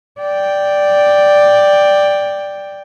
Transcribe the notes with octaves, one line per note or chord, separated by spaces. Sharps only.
D5 G5